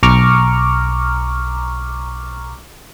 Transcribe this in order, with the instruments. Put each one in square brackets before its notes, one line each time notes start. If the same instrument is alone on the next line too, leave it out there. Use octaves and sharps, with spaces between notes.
[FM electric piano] B1 A#5 C#6 D6 F6